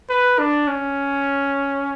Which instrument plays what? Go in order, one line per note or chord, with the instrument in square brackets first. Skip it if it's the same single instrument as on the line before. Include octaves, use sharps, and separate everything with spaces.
[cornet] B4
D4
C#4